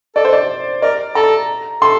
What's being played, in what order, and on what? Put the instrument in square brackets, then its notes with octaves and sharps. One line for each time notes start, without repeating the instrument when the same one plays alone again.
[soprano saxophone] A4 [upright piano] D5
[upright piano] C5
D5
[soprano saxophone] A#4 [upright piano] D5
[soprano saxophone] A4 [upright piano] A#5
[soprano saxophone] A4 [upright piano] C6